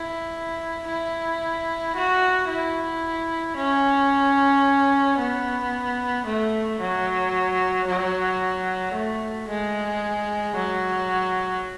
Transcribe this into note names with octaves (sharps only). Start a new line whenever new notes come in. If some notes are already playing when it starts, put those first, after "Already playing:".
Already playing: E4
E4
F#4
E4
C#4
B3
A3
F#3
F#3
A3
G#3
F#3